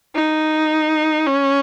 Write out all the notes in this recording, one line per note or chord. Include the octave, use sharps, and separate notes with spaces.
D#4
C#4